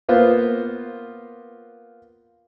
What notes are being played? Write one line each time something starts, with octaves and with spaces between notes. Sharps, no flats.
A#3 B3 F4 C5